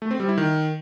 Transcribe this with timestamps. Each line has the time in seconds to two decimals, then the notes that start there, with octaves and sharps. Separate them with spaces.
0.02 A3
0.11 C4
0.20 G3
0.29 E4
0.38 D#3